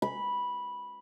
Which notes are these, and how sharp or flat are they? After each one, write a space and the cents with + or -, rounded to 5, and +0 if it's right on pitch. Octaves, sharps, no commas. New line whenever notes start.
B5 -10